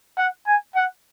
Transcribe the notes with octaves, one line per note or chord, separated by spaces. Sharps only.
F#5
G#5
F#5